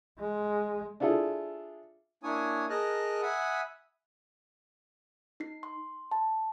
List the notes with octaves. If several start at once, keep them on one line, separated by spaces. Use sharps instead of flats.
G#3
D4 E4 F4 G#4 A4
A#3 D4 E4 C#5 G#5 D#6
G#4 A#4 D#5 A5 F6 F#6
E5 F#5 G#5 B5 D#6
D#4 C7
C6
A5